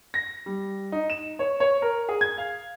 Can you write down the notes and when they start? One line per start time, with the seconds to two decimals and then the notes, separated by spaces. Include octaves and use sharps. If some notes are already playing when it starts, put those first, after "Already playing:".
0.14 A#6
0.46 G3
0.92 D#4
1.10 E7
1.39 C#5
1.60 C#5
1.82 A#4
2.09 G#4
2.21 G#6
2.38 F5